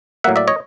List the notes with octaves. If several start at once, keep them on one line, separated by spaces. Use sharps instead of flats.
A2 F#3 A#3 E5 F#5
D5 E5
C#5 D#5